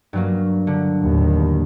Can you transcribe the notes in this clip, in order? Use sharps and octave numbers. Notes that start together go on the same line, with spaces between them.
G2 F#3 A#3
D3
D#2 A2